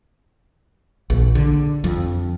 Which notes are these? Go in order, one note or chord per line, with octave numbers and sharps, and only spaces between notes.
A#1
D3
F2